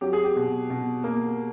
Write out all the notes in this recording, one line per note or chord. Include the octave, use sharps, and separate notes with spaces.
F#3 G4
G#4
G4
B2
B2
A#3